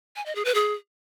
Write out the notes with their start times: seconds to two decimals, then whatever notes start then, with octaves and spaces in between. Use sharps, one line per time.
0.16 G#5
0.26 D#5
0.35 G#4
0.45 B4
0.55 G#4